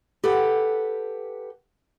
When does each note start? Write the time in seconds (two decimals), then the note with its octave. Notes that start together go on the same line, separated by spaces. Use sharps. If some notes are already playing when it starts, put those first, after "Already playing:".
0.24 G4 A4 B4 F#5